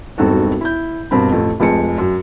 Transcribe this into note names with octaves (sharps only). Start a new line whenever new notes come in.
E1 G2 C4 D#4 F#4 A4
E4 G6
G2 B2 C4 A#4 B5
A1 F2 A4
F1 F2 G#3 C#7
F#2